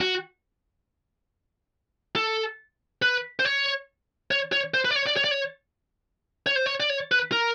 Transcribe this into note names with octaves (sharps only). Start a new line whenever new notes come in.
F#4
A4
B4
C5
C#5
C#5
C#5
C5
B4
D5
C#5
D5
C#5
D5
C#5
C#5
C5
C#5
D5
C#5
B4
A#4